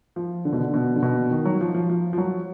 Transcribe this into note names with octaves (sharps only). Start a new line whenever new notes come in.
F3
D3
B2
D3
B2
D3
B2
D#3
F#3
F3
F3
F3
F3
F#3